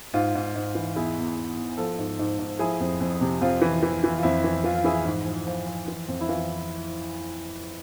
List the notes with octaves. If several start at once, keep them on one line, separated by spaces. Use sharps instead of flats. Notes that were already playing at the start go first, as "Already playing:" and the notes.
G#2 F4
G#2
G#2
E3
E2 E4 G#4
E2
E2
E2
F3 F4 A4
G#2
G#2
G#2
F3 E4 G#4
F2
F2
C3
F2 F4
E3
E3
E3
F4
F2 E4
E3
E3 F4
F4
E3 E4 G#4
G#2
F3
F3 F4
F3
E3
F2
E4
E3 F4